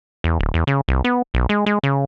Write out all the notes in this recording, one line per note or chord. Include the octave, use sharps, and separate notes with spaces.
E2
D1
E2
C#3
C2
B3
B1
G#3
G#3
C#3